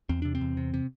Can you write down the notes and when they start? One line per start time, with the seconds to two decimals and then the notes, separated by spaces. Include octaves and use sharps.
0.09 E2 C4
0.22 C3 D4
0.35 C4
0.41 E2
0.57 C3
0.74 C3